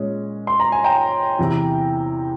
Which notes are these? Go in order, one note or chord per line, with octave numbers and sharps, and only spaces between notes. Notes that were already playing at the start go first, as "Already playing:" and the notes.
Already playing: A#2 G#3 C#4
C6
A#5
G#5
G5 A#5
E2 C3 E3